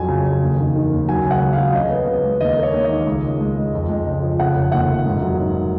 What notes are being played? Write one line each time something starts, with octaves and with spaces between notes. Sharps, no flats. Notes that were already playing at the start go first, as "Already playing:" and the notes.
Already playing: F2 F#3 G#5
C#3
C#3
D#2
D#3
D#3
D#2
F#3 G#5
C#3
F#5
C#2
F#3 F5
C#3 D#5
B3
C#3
G#3
D#2 D#5
A#3
C#5
D#2
D#5
D#3
C#2
G#3
G#3
G#3
F2
G#3
C#3
F3
C#3 F#5
F1
D#2 F#5
F1
G#2
F#3
D#3